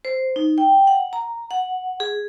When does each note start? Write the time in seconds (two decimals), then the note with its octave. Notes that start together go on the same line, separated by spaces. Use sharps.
0.05 C5
0.36 D#4
0.58 G5
0.87 F#5
1.13 A#5
1.51 F#5
2.00 G#4